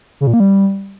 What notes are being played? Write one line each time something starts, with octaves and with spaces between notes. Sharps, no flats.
C#3
A#2
A#3
G3